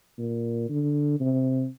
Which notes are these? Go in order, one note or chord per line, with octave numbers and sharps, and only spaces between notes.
A#2
D3
C3